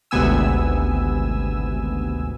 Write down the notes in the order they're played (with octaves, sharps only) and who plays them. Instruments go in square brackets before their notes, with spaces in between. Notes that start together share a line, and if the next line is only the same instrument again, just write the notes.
[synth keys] G#1 D2 C3 B3 G#5 E6